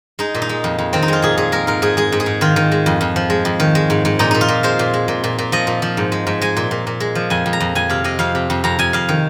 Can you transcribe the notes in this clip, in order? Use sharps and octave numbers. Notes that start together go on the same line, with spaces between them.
G#3 D#4
A#2
D#4
G#3
F2
F2
D#3 C4
D#4
G#3 F4
A#2 G#4
A#2 G#4
G#3 A#4
G#2 A#4
G#2 G#4
G#3 G#4
G#2
G#4
G#2
D#3 F4
D#3
G#3
F2
F2
F3
G#3
F2
D#3
G#3
G#2
G#2
A#2 D#4
A#2 D#4
F4
A#2
G#3 C5
A#2
G#3
A#2
A#2
A#2
F3 D#5
A#2
F3
G#2
G#3
G#2
G#3 G#5
A#2
A#2
A#2
G#3
F3
F2 G#5
F2
A#5
F2
F2 G#5
C3 F5
C3 D#5
F2 F5
C3
F2
F2 A#5
F2 G#5
F2 F5
D#3